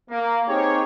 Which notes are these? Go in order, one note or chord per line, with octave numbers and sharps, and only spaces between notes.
A#3
C4 D#4 G4 G#4 C#5